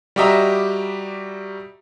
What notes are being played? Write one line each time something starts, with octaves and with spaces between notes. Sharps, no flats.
G3 F#4 G4 D#5 E5 A#5